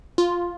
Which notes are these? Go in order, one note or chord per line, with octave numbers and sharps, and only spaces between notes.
F4